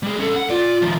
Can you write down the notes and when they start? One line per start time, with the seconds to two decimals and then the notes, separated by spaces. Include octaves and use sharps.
0.03 G3 G#4
0.19 C#4 A4
0.36 F#5
0.50 F4 D5
0.82 D#3 F3